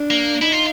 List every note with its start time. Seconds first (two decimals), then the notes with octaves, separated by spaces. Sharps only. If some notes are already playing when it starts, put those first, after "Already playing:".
Already playing: D4
0.10 A#3
0.41 D#4 E4
0.52 F4